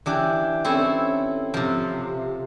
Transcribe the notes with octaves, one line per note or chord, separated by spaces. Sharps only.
E3 D4 G4
C4 C#4 E4 A4
C3 F3